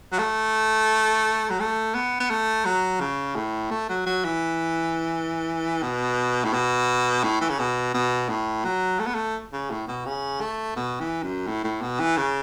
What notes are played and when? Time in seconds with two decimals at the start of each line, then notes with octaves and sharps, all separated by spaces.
0.12 F#3
0.19 A3
1.50 F#3
1.60 A3
1.95 B3
2.20 B3
2.30 A3
2.65 F#3
3.00 C#3
3.36 A2
3.71 A3
3.89 F#3
4.06 F#3
4.24 E3
5.82 B2
6.44 A2
6.53 B2
7.24 A2
7.41 E3
7.50 C#3
7.59 B2
7.94 B2
8.29 A2
8.65 F#3
8.99 A3
9.07 B3
9.14 A3
9.53 C#3
9.71 A2
9.88 B2
10.06 C#3
10.41 A3
10.76 B2
11.00 E3
11.23 F#2
11.47 A2
11.64 A2
11.82 B2
12.00 E3
12.17 C#3